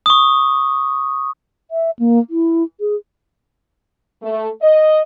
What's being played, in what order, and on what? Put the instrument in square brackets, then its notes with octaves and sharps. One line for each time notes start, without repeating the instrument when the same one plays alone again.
[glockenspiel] C#6 D#6
[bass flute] E5
A#3
E4
G#4
[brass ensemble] A3
D#5